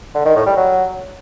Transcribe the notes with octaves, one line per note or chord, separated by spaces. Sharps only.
D3
D#3
A2
G3
F#3